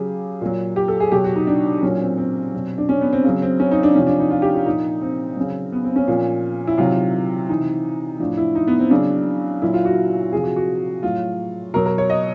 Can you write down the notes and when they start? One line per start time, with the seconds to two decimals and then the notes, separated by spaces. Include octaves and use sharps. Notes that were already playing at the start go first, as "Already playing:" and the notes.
Already playing: C#3 F#3 G4 G#4
0.41 A#2 F#3
0.76 G4
0.88 A4
1.00 G#4
1.12 B2 F#3 G4
1.24 F#4
1.36 D#4
1.47 D4
1.83 A#2 F#3 C#4
2.00 C4
2.18 C4
2.53 B2 F#3
2.78 D4
2.89 C#4
3.01 B3
3.13 C4
3.24 C#3 F#3
3.42 C4
3.60 C#4
3.71 D#4
3.83 D4
3.95 C3 F3 C#4
4.07 D4
4.19 D#4
4.30 F4
4.42 G4
4.54 F4
4.66 A#2 F3 D#4
5.01 C4
5.37 C#3 F#3
5.72 B3
5.84 C4
5.96 C#4
6.08 A#2 F3
6.67 E4
6.78 C3 D#3 F#3 F4
7.49 C3 E3 D#4
8.19 A2 F3 D4
8.37 E4
8.55 D#4
8.68 B3
8.79 C4
8.90 C#3 F#3 D4
9.62 A#2 F#3 E4
9.74 F4
9.85 F#4
10.32 C3 F3 G#4
10.44 F#4
10.56 F#4
11.03 A2 F#3 F4
11.74 B2 F#3 A#4
11.86 A#4
11.98 C#5
12.10 D#5